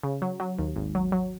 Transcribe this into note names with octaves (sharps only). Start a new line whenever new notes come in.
C#3
F#3
F#3
D#2
G#1
F#3
F#3